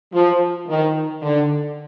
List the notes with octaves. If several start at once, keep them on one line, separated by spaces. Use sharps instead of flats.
F3
D#3
D3